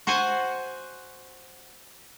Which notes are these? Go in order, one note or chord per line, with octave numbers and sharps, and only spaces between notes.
F#4 C5 F#5 G#5